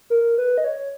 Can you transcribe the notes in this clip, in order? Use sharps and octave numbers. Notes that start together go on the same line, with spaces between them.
A#4
B4
D#5
C#5